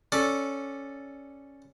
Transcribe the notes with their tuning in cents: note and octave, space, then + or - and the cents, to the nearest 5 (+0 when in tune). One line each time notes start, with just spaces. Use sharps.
C#4 +0 A4 +0 D5 +0